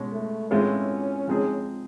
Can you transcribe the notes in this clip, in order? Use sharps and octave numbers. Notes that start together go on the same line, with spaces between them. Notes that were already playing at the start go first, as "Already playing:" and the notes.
Already playing: B2 G#3 C#4
A3
A2 E3 G#3 C4 C#4 F4
F3 G#3 C4 D#4 G#4